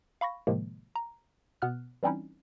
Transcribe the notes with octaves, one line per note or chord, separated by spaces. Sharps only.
F5 B5 C#6 A#6
A2 C3 D#3 F3 G#3 A#3
A#5
B2 B3 F6 F#6
E3 G3 C4 C#4 D#4 E4